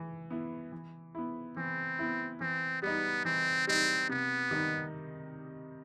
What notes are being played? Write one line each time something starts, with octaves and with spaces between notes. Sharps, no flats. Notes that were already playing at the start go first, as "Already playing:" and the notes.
Already playing: E3
B3 E4
E3
B3 E4
E3 C4
B3 E4
E3 C4
G3 B3 D#4
E3 C4
G3 C4 D#4
C3 B3
D#3 G3 D#4